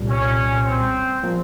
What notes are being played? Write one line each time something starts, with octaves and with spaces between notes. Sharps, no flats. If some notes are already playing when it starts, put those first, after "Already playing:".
Already playing: C2 A#2 G3
C#4
C4
F3 A#3